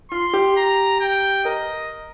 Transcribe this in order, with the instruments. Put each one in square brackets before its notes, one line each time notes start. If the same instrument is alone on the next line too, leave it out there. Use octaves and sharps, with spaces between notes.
[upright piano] F4 [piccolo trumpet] C6
[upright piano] G4
[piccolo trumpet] A#5
G5
[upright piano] A#4 [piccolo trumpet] D#5